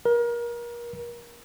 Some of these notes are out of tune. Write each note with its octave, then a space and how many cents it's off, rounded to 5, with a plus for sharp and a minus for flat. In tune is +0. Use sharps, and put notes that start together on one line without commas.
A#4 +30